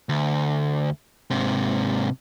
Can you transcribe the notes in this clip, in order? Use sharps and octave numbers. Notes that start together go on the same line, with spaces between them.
D2
G#2 C3